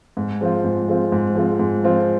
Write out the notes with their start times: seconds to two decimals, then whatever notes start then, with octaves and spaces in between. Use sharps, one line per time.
0.17 G#2
0.41 F3 G#3 C4 F4
0.64 G#2
0.88 F3 G#3 C4 F4
1.12 G#2
1.35 F3 G#3 C4 F4
1.59 G#2
1.84 F3 G#3 C4 F4